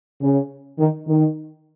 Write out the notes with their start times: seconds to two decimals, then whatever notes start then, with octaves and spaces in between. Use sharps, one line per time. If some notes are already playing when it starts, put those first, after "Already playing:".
0.21 C#3
0.79 D#3
1.07 D#3